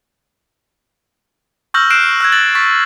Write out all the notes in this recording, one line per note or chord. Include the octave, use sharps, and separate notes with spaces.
C#6 E6 F6 G6 A#6 F#7
F6 F#6 C7 D7 E7
E6 F#6 G#6
F#6 A6 F#7
C#6 A6 B6